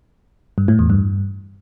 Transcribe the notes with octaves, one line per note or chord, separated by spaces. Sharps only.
G2
A2
E2
G2